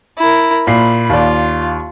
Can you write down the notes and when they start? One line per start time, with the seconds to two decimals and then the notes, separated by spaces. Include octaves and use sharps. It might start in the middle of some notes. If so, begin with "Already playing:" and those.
0.19 E4 A#4
0.67 A#2 B5 C7
1.09 D#2 F4 D5